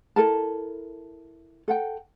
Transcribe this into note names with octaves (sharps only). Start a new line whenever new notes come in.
E4 A4 A#4 A5
A4 F#5 G5